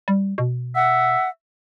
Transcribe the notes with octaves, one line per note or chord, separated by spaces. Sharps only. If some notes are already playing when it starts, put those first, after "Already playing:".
G3
B2
E5 F#5